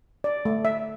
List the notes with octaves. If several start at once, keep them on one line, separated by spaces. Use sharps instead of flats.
D5
A3
E5